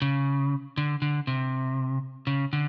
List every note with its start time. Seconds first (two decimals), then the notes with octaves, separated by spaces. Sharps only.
0.02 C#3
0.77 D3
1.02 D3
1.27 C3
2.27 C#3
2.53 D3